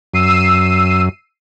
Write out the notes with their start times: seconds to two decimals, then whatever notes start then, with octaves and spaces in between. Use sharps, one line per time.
0.14 F#2 E6 C7 D#7